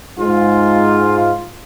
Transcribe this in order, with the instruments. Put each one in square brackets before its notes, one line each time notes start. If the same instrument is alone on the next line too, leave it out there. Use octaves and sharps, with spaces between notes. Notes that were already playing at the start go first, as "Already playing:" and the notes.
[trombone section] G#2 F4